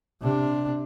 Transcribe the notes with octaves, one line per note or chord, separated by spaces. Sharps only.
C3 D4